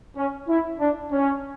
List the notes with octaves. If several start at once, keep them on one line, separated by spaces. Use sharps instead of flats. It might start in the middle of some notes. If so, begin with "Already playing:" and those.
C#4
E4
D4
C#4